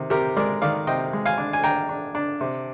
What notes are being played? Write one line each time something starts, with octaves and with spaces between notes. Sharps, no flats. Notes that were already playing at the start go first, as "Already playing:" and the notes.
Already playing: C3 D#3
C3 G4 A#4
G#3 A#4 D5
D#3 D5 F5
C3 D#5 G5
G#3
F5 G#5
D4
G#5
D4 G5 A#5
D4
D4
C3